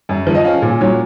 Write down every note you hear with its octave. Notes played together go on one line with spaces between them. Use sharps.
F#2
F3
D#5
C#4 F5
A#2
F#3 C#5